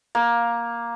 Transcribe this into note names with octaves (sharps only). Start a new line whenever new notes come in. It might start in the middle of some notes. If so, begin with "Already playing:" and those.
A#3